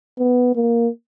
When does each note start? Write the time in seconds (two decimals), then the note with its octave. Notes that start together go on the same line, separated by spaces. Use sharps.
0.19 B3
0.56 A#3